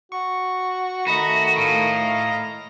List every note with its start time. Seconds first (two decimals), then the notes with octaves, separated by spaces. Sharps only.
0.12 F#4 C#6
1.07 D#3 A3 F#4 D#5 A#5 B5 A#6
1.57 A2 F5